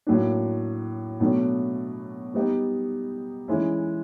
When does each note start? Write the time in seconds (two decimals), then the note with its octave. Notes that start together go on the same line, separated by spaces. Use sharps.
0.07 A2 F#3 A#3 D4
1.20 B2 F#3 A3 D4
2.34 G3 B3 D#4 G4
3.48 E3 G#3 C#4 E4